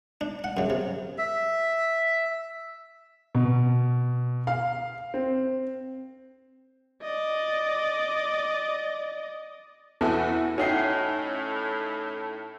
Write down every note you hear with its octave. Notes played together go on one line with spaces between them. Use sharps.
D4
F#5
F#2 C#3
C3
E5
B2
F5
C4
D5 D#5
E2 B3 E4 F#4 A4
A2 C#4 D#4 F#4 E5 G5 C7